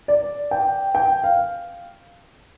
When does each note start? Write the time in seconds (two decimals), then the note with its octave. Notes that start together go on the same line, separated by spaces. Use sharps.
0.08 D5
0.51 G5
0.95 G5
1.24 F5